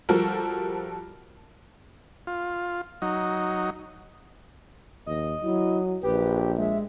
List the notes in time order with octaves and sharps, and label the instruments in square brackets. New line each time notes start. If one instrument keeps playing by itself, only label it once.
[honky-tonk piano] F3 G3 F#4 A4 A#4
[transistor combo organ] F4
F#3 D#4
[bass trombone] D#2 [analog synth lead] D#5
[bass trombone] F#3 [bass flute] E4
[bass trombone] A#1 [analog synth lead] G4 [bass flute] B4
[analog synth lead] G#3 [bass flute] E5